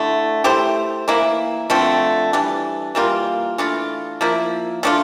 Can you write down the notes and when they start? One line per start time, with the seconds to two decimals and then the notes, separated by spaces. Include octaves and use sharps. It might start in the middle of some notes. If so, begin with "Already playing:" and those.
Already playing: D3 A3 E4
0.44 A3 E4 G4 C5
1.08 E3 A#3 E4
1.70 D3 F3 A3 C4
2.33 E3 G3 D4
2.95 E3 G3 A#3 F4
3.58 E3 A3 D4 F4
4.21 F3 A#3 E4
4.83 F3 A3 D4 F4